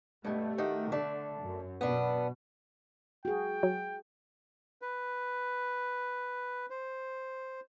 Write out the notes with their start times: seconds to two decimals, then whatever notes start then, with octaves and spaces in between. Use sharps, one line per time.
0.25 G2 B2 A3
0.58 D#3 F#4 G4
0.92 D3 A3 D4
1.43 F#2
1.81 B2 B3 D4
3.25 F#4 G#4 G5
3.63 F#3
4.82 B4
6.70 C5